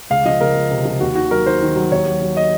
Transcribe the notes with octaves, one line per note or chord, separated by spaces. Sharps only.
C#2 F5
F3 D#5
C#2 A#4
C#2
C3
F3
D#2 F#4
D#3 F#4
F#3 A#4
D#3 C5
D#3
F#3
D#2 C#5
F#3
F#3
D#5